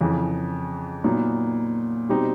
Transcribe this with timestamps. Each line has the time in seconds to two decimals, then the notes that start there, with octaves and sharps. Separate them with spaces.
0.01 F2 C#3 E3
1.04 A#2 F#3 B3 D#4
2.09 B2 G3 C4 D#4 G4